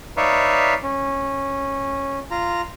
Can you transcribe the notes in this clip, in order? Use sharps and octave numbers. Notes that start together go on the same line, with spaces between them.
D#4 B4 C#5 D5 E5 F5
C#4
F4 A#5